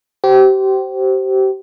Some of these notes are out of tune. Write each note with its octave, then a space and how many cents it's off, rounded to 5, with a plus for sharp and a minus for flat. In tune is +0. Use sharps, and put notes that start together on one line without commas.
G4 -30 C5 +0